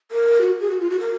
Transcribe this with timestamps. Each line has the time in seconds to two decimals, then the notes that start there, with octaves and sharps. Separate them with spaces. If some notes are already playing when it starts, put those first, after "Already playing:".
0.11 A#4
0.41 F#4
0.61 G#4
0.70 F#4
0.80 F4
0.90 F#4
0.99 A#4